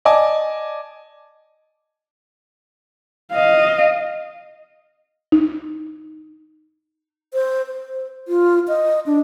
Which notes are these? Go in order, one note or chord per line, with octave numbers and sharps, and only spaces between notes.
D5 D#5 G#5 A5 D6
D#5 F5
D#4
C5
C5
F4
D#5
D4